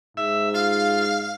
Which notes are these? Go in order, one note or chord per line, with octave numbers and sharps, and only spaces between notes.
G#2 E5
F4 F5